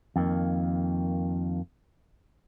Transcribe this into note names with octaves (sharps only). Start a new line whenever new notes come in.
F2 D#3 A#3